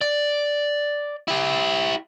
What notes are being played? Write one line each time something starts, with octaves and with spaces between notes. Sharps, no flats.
D5
E4 G4